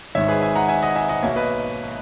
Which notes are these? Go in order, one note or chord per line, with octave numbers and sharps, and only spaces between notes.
G#1 G#2 D#3 C#5 E5
G#4 B4
E5 G#5
F#5 A#5
E5 G#5
D#5 F#5
E5 G#5
D#5 F#5
B1 B2 A#3 C#5 E5
B4 D#5